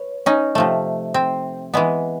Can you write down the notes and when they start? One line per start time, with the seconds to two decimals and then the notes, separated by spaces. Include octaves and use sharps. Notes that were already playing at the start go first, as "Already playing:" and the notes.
Already playing: B4 C#5
0.26 C#4 D#4
0.55 C3 F3 A3
1.14 C4
1.74 E3 G#3 B3